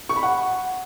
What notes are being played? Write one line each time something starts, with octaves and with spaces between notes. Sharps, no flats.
C#6
B5
F#5